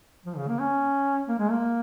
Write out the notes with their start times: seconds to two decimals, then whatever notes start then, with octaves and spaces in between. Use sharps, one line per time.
0.26 F3
0.37 C#3
0.48 A#3
0.60 C#4
1.29 A#3
1.39 G#3
1.51 A#3